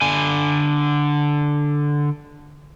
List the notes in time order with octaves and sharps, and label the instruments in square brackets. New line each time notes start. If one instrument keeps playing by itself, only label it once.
[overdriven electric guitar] D3 G#5